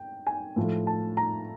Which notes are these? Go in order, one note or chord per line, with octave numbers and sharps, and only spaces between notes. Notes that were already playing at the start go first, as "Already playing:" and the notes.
Already playing: G5
G#5
A2 F3 A3
A5
A#5